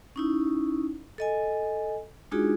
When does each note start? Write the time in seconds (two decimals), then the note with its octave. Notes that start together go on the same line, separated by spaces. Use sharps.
0.16 C#4 D#4 E4
1.18 A4 D#5 G#5
2.32 G#3 D4 D#4 F4 F#4 G#4